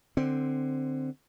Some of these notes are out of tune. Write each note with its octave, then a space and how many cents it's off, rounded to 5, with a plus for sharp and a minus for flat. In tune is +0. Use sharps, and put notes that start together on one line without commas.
D3 +20 C4 +0